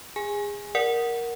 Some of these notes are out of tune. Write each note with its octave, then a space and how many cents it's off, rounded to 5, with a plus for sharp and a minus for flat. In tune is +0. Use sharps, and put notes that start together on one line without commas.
G#4 -25 G#5 +0
A#4 +5 D5 +0 F#5 +0